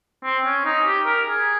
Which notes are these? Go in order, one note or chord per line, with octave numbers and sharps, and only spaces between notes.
C4
C#4
D#4
G4
A#4
G#4